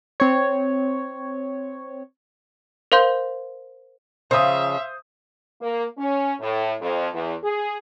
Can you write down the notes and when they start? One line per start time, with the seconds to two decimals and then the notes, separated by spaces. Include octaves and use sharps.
0.20 C4 C#5
2.92 A#4 C5 F5 C6 G6
4.31 C#3 F3 C5 E5 F5 D#6
5.62 A#3
5.98 C#4
6.40 A2
6.81 F2
7.14 E2
7.44 G#4